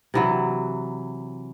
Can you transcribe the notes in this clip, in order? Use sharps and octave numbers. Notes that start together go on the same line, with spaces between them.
C3 E3 F#3